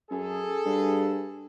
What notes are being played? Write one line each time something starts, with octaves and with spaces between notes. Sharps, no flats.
F#2 G#4 A4
G2